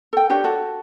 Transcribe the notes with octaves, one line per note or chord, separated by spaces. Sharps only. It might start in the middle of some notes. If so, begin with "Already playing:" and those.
A4 G5
D4 F#4 G4 C#5
F#4 A4